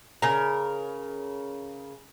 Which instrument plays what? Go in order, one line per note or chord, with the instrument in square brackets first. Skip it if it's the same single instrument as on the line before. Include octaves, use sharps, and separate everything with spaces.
[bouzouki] C#3 A#4